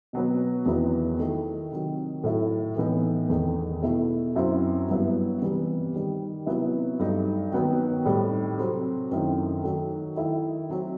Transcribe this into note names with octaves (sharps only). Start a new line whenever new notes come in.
B2 F#3 B3
E2 D#3 F#3 B3 E4
D#3 A3 E4
C3 D#3 F#3
A2 F#3 A3 E4
A2 E3 B3 D#4
E2 D#3 A3
B2 A3 E4
F#2 F#3 C4 E4
G2 F#3 B3 E4
C3 E3 G3 B3
D#3 G3 D#4
C3 F#3 B3 E4
G2 F#3 A3 D#4
D#3 F#3 B3
A2 G3 C4 D#4
C3 F#3 A3 C4
F#2 D#3 A3 C4 E4
D#3 F#3 A3
D#3 A3 E4
F#3 C4